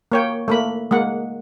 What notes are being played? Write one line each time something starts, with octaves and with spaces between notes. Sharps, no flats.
A#3 C#5 G5
A3 A#3 B5
G#3 A#3 F#5